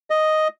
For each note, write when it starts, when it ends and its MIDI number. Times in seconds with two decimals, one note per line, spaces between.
0.10 0.48 75